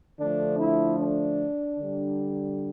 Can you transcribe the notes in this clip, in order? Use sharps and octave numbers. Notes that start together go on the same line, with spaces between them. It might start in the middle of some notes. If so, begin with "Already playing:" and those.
D3 F3 A3 D4
E4
D4
D3 G3